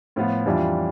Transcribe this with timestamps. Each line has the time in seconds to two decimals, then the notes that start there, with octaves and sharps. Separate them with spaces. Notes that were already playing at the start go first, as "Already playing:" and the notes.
0.16 A2 F3 B3 F4
0.46 F2 E3 G3 D4 F4